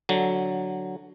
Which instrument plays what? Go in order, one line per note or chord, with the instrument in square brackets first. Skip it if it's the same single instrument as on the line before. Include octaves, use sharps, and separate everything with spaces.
[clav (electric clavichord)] D3 F#3